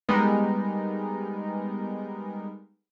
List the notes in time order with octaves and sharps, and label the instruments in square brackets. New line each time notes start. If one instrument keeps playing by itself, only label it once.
[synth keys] G3 G#3 B3 D#4 A#4